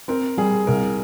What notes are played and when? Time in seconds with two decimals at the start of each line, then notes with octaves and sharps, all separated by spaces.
0.08 C4 A#4
0.37 G3 G#4
0.67 C2 A#4